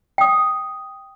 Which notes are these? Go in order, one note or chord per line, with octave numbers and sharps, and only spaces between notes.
G5 D#6